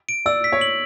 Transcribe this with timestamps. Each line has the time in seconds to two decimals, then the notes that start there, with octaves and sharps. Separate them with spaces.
0.09 D7
0.26 D5 E6
0.44 B6
0.52 C#5
0.61 F#7